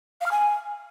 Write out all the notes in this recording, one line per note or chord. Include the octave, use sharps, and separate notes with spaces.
F5
F6
G#5